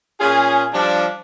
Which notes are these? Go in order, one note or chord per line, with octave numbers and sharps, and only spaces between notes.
A#2 C#4 F4 G#4
F3 G3 D4